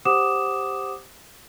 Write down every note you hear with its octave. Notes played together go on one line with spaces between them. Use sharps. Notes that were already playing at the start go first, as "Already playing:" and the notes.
G4 C5 F#5 D6 D#6 E7